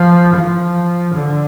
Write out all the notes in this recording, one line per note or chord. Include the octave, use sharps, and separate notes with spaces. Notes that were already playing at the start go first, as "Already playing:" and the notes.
Already playing: F3
F3
D3